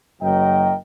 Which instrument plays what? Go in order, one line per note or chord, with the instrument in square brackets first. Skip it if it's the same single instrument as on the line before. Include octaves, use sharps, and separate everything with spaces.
[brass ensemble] F#1 F#2 F#3 A#4 D#5 G5